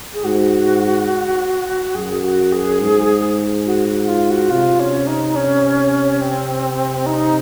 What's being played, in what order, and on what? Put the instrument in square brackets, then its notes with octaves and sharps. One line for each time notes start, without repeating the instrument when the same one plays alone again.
[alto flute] G#4
[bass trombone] G#2 [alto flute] F#4
[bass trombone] F#2 [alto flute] G#4
[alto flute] F#4
G#4
[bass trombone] G#2
[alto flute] F#4
F#4
F#4
F4
F#4
[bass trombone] C3 [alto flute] F4
[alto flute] C#4
D#4
C#4
C4
D#4